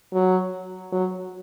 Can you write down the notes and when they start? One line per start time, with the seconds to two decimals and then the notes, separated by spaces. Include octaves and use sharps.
0.13 F#3
0.92 F#3